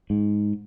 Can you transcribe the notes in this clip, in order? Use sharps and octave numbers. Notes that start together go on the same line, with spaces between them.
G#2